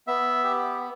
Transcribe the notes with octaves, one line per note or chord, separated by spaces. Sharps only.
B3 E5
G4